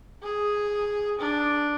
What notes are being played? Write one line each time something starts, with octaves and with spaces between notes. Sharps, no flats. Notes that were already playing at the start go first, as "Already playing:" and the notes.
G#4
D4